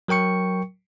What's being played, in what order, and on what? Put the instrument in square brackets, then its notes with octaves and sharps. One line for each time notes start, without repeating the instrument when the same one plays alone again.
[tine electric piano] F#3 A#4 G5 C#6 C#7